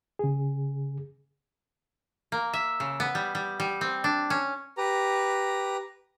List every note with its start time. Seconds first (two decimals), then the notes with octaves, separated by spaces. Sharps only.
0.19 C#3 G#4
2.32 A#3
2.53 E5
2.80 C#3
3.00 B3
3.15 G3
3.35 G3
3.60 G3
3.81 C4
4.04 D4
4.30 C#4
4.77 G4 B4 A#5